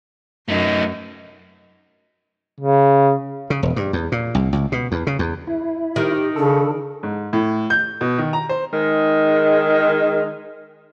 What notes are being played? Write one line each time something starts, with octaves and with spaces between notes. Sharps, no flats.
F#2 A3 D#4
C#3
C#3
E1
G2
E2
A#2
C2
C#2
B2
E2
C#3
E2
E4
D#3 G4
C#3 D4 A4
G#2
A2
G6
B2
D#3
A#5
C5
D#3 G#3